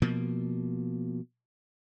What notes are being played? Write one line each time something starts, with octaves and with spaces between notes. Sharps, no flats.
B2 F3 A#3